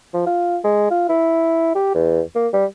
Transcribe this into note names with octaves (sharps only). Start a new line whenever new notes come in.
F3
F4
G#3
F4
E4
G4
E2
A#3
G3